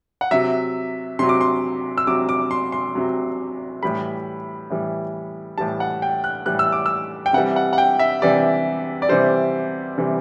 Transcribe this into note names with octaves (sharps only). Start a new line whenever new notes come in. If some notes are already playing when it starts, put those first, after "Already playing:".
F#5
C3 F#3 E5
C3 F#3 C6
D6
C6
E6
C3 F#3 D6
D6
C6
C6
C3 F#3
A2 E3 G3 B5
A2 E3 G3
A2 E3 G3 A5
F#5
G5
F#6
A2 E3 G3 F#6
E6
D6
E6
G5
C3 E3 G3 F#5
F#5
F#5
G5
E5
C3 E3 G3 D5
D5
C3 E3 G3 C5
C3 E3 G3